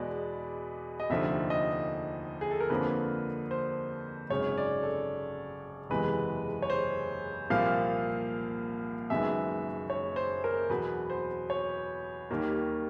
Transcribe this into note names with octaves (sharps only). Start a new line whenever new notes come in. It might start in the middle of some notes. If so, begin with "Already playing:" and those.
Already playing: E2 B2 G#3 B3 D5
D#5
F1 D#2 D3 F3 E5
D#5
G#4
A4
A#4
F2 D3 F3 A#3 B4
C5
G#1 F#2 C#3 C#5
D5
A4
F#1 E2 C3 E3 G#3 B4
C#5
C5
C2 A#2 F3 A#3 F5
F#1 F#2 D#3 G#3 B3 E5
C#5
C5
A#4
E2 B2 F#3 B3 B4
C5
C#5
D#2 D#3 G3 A#3